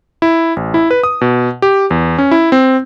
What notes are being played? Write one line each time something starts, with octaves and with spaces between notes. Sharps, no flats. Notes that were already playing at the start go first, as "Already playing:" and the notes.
E4
A1
E4
B4
D#6
B2
G4
E2
C#4
E4
C4